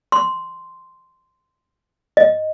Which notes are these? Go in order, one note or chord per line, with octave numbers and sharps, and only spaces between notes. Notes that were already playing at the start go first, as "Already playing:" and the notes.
C6
D#5